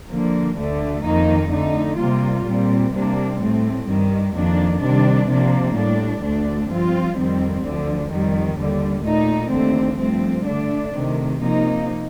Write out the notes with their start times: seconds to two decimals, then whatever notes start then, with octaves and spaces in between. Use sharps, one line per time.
0.10 D3 F3 A#3
0.58 D2 D3 A3
1.04 F2 D#3 A#3 D#4
1.52 D3 A3 D#4
1.99 C3 G3 A#3 F4
2.46 A#2 G3 C4
2.93 C3 G3 A#3 D4
3.40 A2 A3 C4
3.87 G2 D#3 G3
4.34 F2 D#3 A#3 D4
4.81 C3 D#3 G3 D4
5.28 C3 F3 A#3 D4
5.75 A2 G3 D4
6.22 D2 D3 A3 D4
6.69 G2 F3 C4 F4
7.17 F2 D#3 G3 C4
7.64 D2 D3 F3
8.11 F2 D#3 G3
8.58 D#2 D3 G3
9.04 A#2 A3 D#4
9.51 D#2 D3 A3 C4
9.99 G2 F3 A3 C4
10.46 D3 A3 D4
10.93 C3 D#3 A3
11.41 C3 F3 A#3 D#4